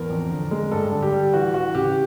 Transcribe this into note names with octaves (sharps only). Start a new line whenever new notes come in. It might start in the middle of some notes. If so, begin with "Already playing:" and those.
Already playing: E2 A#4
F2
D3
G#3
G2 A4
D3
G4
G3
E3 F#4
E3 F#4
C#3 G4